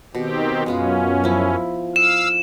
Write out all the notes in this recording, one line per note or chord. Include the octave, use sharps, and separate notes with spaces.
B2 D#3 C4 G4
F#2 G#3 B3 C#4 F4
F3 E4
F5 E6 E7